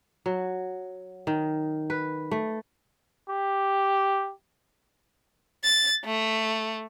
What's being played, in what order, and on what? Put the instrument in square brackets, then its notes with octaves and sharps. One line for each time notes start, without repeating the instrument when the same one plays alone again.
[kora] F#3
D#3
B4
A3
[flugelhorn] G4
[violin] A6
A3